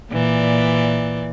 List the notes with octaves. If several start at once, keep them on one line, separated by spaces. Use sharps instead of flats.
A#2 E3 D5